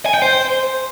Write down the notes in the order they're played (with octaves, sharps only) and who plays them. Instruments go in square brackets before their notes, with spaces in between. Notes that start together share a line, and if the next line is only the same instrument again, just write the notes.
[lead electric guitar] G#5
G5
C5